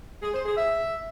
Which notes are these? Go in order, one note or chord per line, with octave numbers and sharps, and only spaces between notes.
G#4
C5
G#4
E5